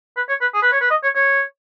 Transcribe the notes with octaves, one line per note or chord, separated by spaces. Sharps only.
B4
C#5
B4
G#4
B4
C#5
B4
D#5
C#5
C#5